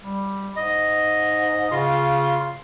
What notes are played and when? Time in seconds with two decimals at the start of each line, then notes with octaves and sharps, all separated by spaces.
0.01 G3
0.56 G#2 D#5
1.71 C#3 F4 C6